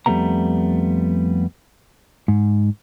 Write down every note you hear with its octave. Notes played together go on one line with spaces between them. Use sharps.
F2 G3 A3 B3 A#5
G#2